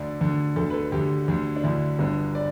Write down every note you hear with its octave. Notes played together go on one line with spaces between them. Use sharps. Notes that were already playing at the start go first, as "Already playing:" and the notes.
Already playing: D2 D3 D5
D2 D3
D2 D3 A4
B4
A4
D2 D3 G4
D2 D3
D4
D2 D3 E4
G1 G2 D3
D5